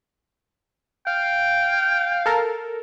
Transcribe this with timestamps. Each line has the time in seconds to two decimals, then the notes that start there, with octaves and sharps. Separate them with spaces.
1.07 F5 G5
2.26 A4 A#4